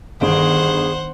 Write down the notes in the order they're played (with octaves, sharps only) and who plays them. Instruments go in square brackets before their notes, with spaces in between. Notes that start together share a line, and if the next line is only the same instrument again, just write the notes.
[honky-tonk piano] G1 G2 D7 [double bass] D#3 [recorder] G#4 [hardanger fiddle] C5 F#5